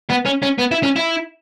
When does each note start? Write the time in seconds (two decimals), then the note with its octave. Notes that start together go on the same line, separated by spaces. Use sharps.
0.10 B3
0.26 C#4
0.42 C#4
0.58 B3
0.71 E4
0.83 C#4
0.96 E4